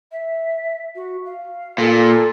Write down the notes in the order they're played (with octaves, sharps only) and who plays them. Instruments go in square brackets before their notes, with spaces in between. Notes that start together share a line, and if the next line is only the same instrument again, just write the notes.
[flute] E5
F#4
F5
[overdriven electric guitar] A#2 [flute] A4